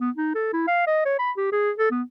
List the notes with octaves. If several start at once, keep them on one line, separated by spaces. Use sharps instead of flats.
B3
D#4
A4
E4
F5
D#5
C#5
B5
G4
G#4
A4
B3